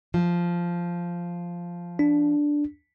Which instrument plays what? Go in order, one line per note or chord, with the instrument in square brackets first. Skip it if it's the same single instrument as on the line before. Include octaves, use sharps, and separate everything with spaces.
[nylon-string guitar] F3
[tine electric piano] D4